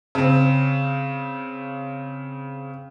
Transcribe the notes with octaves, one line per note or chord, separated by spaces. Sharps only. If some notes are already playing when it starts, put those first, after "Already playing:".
C#3 C4